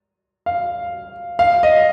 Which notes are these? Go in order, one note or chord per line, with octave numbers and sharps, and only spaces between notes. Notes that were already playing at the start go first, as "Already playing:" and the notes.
F5
F5
D#5